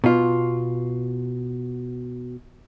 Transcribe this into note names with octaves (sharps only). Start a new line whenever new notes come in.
B2 F4